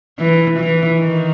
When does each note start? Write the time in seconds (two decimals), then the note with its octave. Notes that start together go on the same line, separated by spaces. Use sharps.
0.19 E3
0.59 E3
1.00 D#3